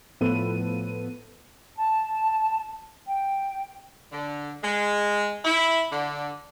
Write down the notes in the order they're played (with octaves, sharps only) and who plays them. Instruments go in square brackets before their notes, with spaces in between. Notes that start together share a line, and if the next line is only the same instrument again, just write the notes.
[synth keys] A2 F3 B3 A4 B4 D#7
[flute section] A5
G5
[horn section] D3
G#3
E4
D3